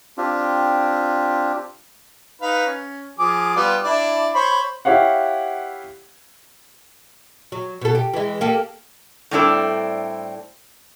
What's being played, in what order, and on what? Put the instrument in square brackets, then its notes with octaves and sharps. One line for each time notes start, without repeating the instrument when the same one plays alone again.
[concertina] C4 D4 F4 G4
[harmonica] D#4 B4 F5
C#4
F3 G#4 D6
G3 B3 F4
D4 E4 D5
C5 C#5 B5
[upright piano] E4 G4 C#5 F5 F#5
[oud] F#3
B2 A4
G4
E3 G#3
A#3 G4 A4
[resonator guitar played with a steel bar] A2 G3 C4 D4 E4 A4